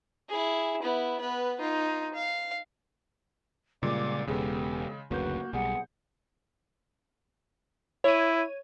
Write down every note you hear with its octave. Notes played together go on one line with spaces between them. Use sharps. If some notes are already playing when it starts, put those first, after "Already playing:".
E4 G#4
B3 E4
B3 B4
D#4 F4
F5
A#2 C#3 G3 G#3 D5 D6
E1 C#3 G#3 B3 G4 A4
F#1 D2 C#3 A#3 F#4 B4 G6
B1 G3 G#4 F#5
E4 C#5 G#6 D#7